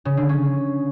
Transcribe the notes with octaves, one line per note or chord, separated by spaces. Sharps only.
C#3
D3
C#4